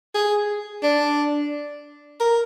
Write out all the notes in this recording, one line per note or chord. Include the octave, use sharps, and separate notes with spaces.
G#4
D4
A#4